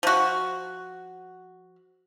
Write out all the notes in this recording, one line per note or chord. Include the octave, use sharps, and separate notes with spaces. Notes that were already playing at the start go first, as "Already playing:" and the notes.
F3 F#4